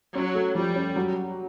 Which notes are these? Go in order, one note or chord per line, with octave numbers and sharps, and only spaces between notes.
F#3 C#4
A3
F3 G3
C#4
F#3